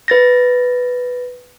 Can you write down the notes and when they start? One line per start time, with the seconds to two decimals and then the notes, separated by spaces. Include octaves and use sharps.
0.08 B4 A6 A#6